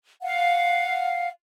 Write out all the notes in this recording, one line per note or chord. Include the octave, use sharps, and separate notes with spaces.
F5 F#5